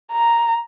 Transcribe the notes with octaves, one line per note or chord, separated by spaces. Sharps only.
A#5